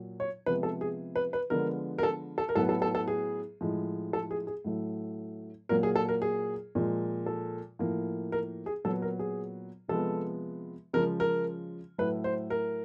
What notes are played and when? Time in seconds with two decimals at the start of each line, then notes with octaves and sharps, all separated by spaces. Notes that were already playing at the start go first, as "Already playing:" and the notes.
Already playing: A#2 F#3
0.20 C#5
0.46 C3 F3 G#3 B3 B4
0.63 A4
0.81 G#4
1.16 B4
1.33 B4
1.50 D3 F3 G#3 B3 A#4
1.98 A#4
2.03 A4
2.38 A4
2.49 A#4
2.55 A2 F#3 B3 A4
2.69 A4
2.82 A4
2.95 A4
3.08 G#4
3.61 A2 F3 G#3
4.13 A4
4.31 G#4
4.47 G#4
4.64 A2 F#3 A3
5.69 A#2 F#3 A#3 A#4
5.83 G#4
5.96 A4
6.09 A#4
6.22 G#4
6.75 A#2 F3 G#3
7.26 A4
7.79 A2 F3 A#3
8.32 A#4
8.66 G#4
8.84 A#2 F#3 B3 A4
9.02 A#4
9.19 G#4
9.88 C3 F3 G#3 B3 A4
10.93 C#3 F3 G#3 A#4
11.20 A#4
11.98 A2 F#3 A3 B4
12.24 C5
12.50 A#4